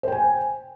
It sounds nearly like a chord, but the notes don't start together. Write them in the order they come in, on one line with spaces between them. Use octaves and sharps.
C5 G5 G#5